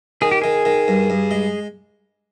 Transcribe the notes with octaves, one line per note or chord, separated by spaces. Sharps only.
D#3 G#4
G4
D#3 G#4
D#3
G2
G2
G#3